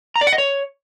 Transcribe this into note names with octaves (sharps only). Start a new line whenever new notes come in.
A#5
D5
F#5
D#5
C#5